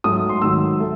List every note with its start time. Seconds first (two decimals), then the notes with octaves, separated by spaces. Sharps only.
0.04 G#2 F#3 A3 D#6
0.29 C6
0.42 G#2 D#3 F#3 E6
0.80 A3